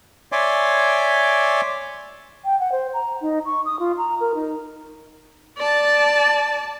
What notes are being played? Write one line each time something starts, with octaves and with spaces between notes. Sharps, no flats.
C#5 D5 E5 G#5 C6 D6
G5
F#5
C5
A#5
D#4
C#6
D#6
F4
A#5
A#4
D#4
D5 A5